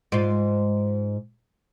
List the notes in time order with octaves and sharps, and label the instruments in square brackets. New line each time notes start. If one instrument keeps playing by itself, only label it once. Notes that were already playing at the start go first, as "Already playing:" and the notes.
[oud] G#2 F4